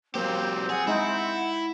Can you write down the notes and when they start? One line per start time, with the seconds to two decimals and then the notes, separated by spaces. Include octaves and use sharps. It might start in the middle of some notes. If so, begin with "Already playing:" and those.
0.15 F#3 A#3 C4 G4 C5
0.70 G#4 F#5
0.87 G#3 D#4 E4